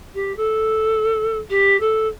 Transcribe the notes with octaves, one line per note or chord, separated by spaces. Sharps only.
G4
A4
G4
A4